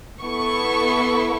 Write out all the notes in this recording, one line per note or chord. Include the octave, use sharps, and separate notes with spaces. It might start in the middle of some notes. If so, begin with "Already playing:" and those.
B3 E4 A4 C#6